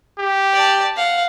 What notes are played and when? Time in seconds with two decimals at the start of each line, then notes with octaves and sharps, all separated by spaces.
0.19 G4
0.54 D5 A5
0.96 F5 F#5